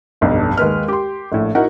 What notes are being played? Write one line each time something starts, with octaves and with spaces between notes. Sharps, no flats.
F1 B1 G2
D#2 G#3 B4 F6
G4 C6
A#1 A2
D#4 E4 F#4 A#4 F#5